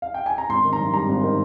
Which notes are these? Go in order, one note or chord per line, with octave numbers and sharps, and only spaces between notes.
F5
G5
G#5
A#5
G#1 C6
D#3
A#5
G2
G3 A#5
G#1
D#3